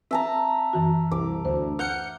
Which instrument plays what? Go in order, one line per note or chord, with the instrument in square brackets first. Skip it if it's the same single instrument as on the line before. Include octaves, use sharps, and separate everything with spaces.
[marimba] C4 [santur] E5 A5 A#5
[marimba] F#2 E3 F#4
[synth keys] C2 [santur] D6
[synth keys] D2 [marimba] C5
[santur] F#5 [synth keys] F6 G6 C#7